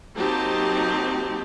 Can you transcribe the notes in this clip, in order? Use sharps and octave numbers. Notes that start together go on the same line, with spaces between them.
F#3 A#3 C4 D#4 G4 A5